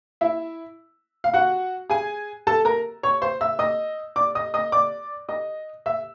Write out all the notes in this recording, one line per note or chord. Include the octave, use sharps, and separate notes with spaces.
E4 E5
F5
F#4 F#5
G#4 G#5
A4 A5
A#4 A#5
C#5 C#6
C5 C6
E5 E6
D#5 D#6
D5 D6
D#5 D#6
D#5 D#6
D5 D6
D#5 D#6
E5 E6